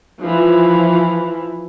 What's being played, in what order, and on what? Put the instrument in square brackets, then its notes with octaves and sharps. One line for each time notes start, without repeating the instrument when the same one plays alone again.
[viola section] E3 F3